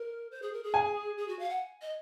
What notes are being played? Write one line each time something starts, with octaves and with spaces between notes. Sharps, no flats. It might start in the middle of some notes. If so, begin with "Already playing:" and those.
Already playing: A#4
C5
G#4
A#4
G#4
G#5
G#4
F#4
F5
F#5
D#5